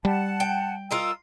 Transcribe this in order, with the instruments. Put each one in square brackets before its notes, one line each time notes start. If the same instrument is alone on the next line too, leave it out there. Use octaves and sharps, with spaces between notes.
[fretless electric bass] G3 [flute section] F#5 A5
[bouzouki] G5
[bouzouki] F4 A#4 D#5 [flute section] E6